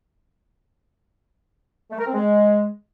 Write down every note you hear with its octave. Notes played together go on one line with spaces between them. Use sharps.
A3
A#4
C4
G#3